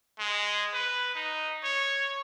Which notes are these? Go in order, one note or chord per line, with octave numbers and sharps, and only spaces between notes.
G#3
B4
D#4
C#5